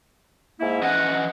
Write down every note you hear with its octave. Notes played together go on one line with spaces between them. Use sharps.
G#2 A#3 E4
E3 C#4 D#5 F#5